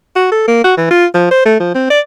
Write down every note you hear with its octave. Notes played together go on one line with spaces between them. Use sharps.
F#4
A4
A#3
F#4
E3
F4
F3
C5
A3
F3
C4
D5